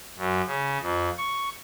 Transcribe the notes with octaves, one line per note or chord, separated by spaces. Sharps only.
F#2
C#3
F2
C#6